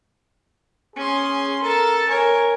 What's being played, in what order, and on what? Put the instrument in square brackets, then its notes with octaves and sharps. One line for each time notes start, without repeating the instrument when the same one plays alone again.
[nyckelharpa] C#4 C6 [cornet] G#4
[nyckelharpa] A4 A5 [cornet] A#4
[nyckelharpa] A#4 C#5 [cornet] G#5